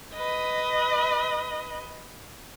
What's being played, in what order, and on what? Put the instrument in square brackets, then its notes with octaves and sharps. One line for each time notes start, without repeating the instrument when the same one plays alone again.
[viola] B4 D#5